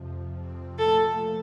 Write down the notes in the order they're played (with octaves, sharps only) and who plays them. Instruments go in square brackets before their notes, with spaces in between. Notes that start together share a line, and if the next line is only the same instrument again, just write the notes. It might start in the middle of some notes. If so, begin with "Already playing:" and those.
Already playing: [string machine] F2 C3 F3
F2 C3 F3 C4
[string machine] A#2 F3 A3 [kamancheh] A4